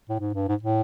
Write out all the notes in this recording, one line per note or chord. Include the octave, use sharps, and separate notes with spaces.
A2
G#2
G2
G#2
A2